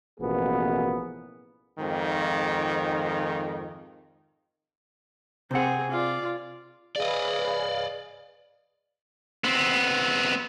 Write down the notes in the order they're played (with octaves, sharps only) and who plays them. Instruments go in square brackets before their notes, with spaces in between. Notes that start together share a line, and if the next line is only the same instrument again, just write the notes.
[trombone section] A1 B2 F3 A#3 B3 G#4
F2 G#2 D#3
[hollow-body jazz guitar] C3 F#5 [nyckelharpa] C4 G#4
[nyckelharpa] F4 D5
[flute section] G#4 B4 F5 [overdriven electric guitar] D5 D#5
[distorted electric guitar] B3 C4